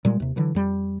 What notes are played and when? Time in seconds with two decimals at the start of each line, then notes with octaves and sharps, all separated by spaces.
0.05 A#2 G3 G#3
0.20 D#2 C3
0.36 D3 E3 F#3
0.55 F2 G3